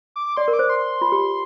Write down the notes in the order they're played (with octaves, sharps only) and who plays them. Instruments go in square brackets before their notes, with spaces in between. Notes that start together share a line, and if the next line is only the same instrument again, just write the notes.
[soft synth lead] D6
D6
[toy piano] D5 [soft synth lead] C6
[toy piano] A#4
[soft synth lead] D6
[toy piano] C5
[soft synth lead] C6
[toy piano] F4
G4